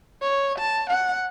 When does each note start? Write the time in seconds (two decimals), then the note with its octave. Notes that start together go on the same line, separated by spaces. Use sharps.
0.21 C#5
0.59 A5
0.90 F#5